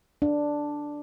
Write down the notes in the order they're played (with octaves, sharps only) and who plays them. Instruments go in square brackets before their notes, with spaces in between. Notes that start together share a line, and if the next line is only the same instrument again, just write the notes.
[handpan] D4